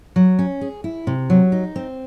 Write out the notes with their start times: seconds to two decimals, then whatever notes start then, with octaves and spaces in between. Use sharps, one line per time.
0.16 F#3
0.39 C#4
0.61 G#4
0.84 E4
1.07 C3
1.30 F#3
1.52 D#4
1.76 C4